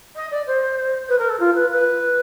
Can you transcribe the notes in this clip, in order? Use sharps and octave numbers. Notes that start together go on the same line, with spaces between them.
D#5
D5
C5
B4
A#4
A4
F4
B4
B4